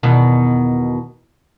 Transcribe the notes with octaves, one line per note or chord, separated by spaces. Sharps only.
E2 B2 D#3